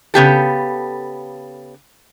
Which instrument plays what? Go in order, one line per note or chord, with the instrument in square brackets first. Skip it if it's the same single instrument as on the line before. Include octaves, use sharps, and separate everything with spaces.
[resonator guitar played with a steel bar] C#3 B3 G4 A4